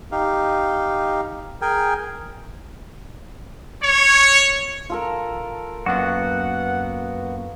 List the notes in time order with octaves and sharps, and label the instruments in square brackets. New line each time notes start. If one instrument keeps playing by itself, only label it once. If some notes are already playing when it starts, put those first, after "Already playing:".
[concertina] D#4 G4 F5
G#4 A#4 G5 G#5
[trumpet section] C#5
[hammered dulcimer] F4 A4 A#4
[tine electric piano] F#2 A#3 [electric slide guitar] B3 F#4 [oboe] F#5